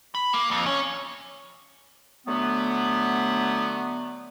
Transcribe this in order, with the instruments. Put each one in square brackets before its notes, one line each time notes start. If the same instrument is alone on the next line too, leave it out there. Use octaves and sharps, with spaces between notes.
[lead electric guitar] B5
A#3
F2
C#4
[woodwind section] D3 F#3 A3 B3